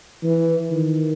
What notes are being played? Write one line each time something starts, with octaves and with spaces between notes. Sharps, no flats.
E3
D#3